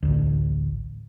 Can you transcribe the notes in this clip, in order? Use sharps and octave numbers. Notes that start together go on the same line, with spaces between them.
A1 D2